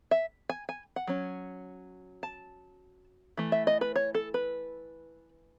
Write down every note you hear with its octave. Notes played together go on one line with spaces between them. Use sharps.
E5
G#5
G#5
F#5
F#3 C#4
A5
E3 A3
E5
D#5
B4
C#5
A4
B4